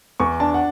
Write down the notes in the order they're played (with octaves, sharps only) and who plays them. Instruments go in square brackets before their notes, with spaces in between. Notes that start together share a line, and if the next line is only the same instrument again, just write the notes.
[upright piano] E2 [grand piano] C#6
[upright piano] D4 [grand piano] A5
[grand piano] F#5